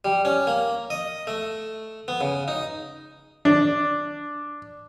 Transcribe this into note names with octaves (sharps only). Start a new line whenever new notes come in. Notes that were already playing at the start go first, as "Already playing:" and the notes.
G3
C#4
A#3
D#5
A3
B3
C#3
D#4
D4